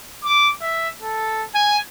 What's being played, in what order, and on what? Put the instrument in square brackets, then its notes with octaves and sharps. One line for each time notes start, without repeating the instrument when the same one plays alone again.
[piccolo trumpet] D6
E5
A4
G#5